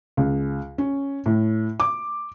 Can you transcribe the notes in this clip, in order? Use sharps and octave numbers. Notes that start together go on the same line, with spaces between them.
C#2
C#4
A2
D6